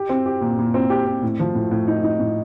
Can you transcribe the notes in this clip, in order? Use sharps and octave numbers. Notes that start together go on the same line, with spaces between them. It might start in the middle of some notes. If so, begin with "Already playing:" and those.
Already playing: G4
C4
G4
A#2
A#2
C4
G4
C4
A2
F3
A2
A2
D#4
D#4
A2